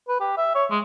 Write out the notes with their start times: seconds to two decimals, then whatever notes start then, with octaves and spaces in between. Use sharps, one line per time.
0.08 B4
0.20 G4
0.37 E5
0.55 C#5
0.70 G#3